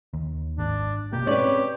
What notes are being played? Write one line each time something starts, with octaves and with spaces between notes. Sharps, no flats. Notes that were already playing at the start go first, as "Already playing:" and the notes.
D#2
G#1 D4
B2 A#3 G4
C4 C#4 B4 C#5 D5